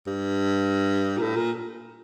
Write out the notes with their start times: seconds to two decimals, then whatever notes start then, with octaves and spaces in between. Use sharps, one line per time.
0.07 G2
1.18 A#2
1.22 A2
1.36 A#2